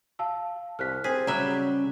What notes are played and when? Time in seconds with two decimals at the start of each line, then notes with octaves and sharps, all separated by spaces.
0.19 F5 A5 E6
0.79 C2 F6 F#6 B6
1.04 C4 G#4 B6
1.27 C#3 F#3 G3 E5 A#5 F#6